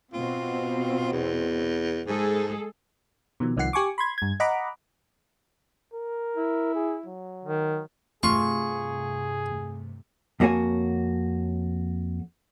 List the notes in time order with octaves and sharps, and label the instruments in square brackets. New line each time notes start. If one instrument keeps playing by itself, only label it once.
[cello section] B2 C4 [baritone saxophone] F4
[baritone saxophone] E2
[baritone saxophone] G#2 [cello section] G#3 G#4 A4
[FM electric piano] B2 D#3 F3
C2 D#3 F3 F#5 C7
G4 G#5 C#6 D6
B5 C6 G#6
G2 G#6
D#5 F#5 A#5 B5 D6
[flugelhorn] A#4
[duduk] E4
[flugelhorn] G#4
F#3
[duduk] D#3
[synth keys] G2 C3 A3 [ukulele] F4 [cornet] G#4 [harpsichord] C#6
[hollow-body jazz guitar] F2 A#3 F#4 C#5 G#5